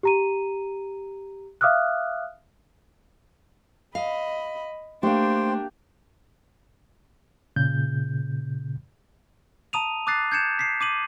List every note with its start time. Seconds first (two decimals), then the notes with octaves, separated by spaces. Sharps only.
0.03 G4 A#5 D#7
1.61 E5 F5 D6 D#6 F6 F#6
3.95 D#5 F5 B5
5.03 A3 A#3 D4 G4 C5 F5 G5
7.56 A#2 C#3 G6
9.73 A5 A#5 D#6 D#7 F7
10.07 D6 D#6 F#6 A6 C7
10.32 G6 G#6 C#7 E7
10.59 B6 C7
10.81 D6 D#7 F#7